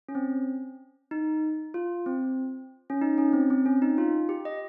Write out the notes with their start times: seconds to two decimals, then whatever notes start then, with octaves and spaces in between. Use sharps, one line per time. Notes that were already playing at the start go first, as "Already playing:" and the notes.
0.09 C#4
0.15 C4
1.11 D#4
1.74 F4
2.06 C4
2.90 C#4
3.02 D#4
3.18 C#4
3.33 C4
3.50 C4
3.66 C#4
3.82 D#4
3.98 F4
4.29 G4
4.45 D#5